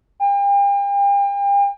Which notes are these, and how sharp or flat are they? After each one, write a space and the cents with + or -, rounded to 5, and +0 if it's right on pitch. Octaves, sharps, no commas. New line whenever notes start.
G5 +40